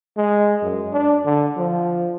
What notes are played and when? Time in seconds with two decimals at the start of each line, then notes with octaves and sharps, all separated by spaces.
0.17 G#3
0.63 F#2
0.93 D4
1.25 D3
1.57 F3